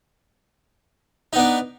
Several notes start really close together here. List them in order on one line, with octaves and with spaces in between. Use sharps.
D#4 B3 D4